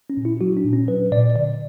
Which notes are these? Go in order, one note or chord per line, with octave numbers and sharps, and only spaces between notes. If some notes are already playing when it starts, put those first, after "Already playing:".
C#4
A#2
E4
F#3 F#4
D4
A#2
C#4
F#3 B4
A#2 D5
D3 D5